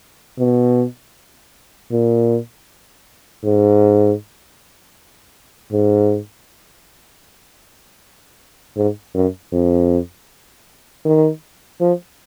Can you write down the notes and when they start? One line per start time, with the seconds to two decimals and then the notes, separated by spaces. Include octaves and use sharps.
0.39 B2
1.92 A#2
3.44 G#2
5.72 G#2
8.76 G#2
9.15 F#2
9.52 F2
11.05 D#3
11.81 F3